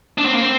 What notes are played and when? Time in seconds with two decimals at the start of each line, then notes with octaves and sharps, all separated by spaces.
0.18 D4
0.25 C4
0.33 A#3
0.41 C4